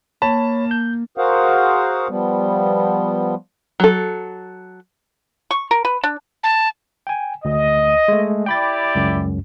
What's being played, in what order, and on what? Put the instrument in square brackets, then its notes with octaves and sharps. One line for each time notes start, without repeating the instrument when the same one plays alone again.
[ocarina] A#3 [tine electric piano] C#5 B5 [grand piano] A5
[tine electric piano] G6
[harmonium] F#4 G#4 A#4 C5 F5 F#5
F3 G3 B3
[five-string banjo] F#3 A4
[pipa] C#6
A#4
B4
D4
[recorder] A5
[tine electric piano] G5 G#5
[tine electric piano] D2 [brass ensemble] D#5
[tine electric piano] G#3 A3
[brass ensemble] E4 G4 D5 [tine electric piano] G5 B5 A6
[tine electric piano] C#2 F#2